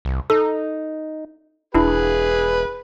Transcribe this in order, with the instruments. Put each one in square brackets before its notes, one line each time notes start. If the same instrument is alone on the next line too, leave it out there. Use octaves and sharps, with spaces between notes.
[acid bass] C2
[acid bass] D#4 [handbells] A4
[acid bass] E1 [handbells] D4 E4 [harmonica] G#4 B4